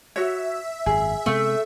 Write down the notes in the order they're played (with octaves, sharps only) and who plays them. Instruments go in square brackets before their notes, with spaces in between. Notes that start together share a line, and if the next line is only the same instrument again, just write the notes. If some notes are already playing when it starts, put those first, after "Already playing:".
[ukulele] F#4 C#5 [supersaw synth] E5
[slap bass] G#1 F#2 [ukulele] G#4
[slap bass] C3 G#3 B3 [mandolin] A3